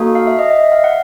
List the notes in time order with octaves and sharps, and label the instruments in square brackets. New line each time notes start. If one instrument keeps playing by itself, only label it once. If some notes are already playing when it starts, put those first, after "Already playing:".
Already playing: [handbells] A#3 D#4 F#4 A4
F5
E5
D#5
D#5
E5
F5
F#5